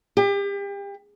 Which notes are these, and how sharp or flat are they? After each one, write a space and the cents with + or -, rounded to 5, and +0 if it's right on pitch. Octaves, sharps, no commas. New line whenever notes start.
G4 +35